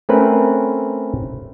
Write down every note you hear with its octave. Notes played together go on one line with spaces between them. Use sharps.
A3 C4 C#4 A#4 B4